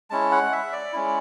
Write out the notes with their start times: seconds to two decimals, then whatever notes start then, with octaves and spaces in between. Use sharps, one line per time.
0.10 G#3 C#4 E4 A5
0.32 F#5
0.52 E5
0.72 D5
0.93 G#3 C#4 E4